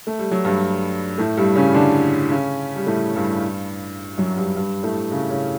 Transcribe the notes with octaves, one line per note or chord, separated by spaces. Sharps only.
A3
G3
F#3
G2 G3
A2 A3
G2 G3
C#3 C#4
D3 D4
C#3 C#4
G3
A2 A3
G2 G3
F#2 F#3
G2 G3
G2 G3
A2 A3
C#3 C#4
C#3 C#4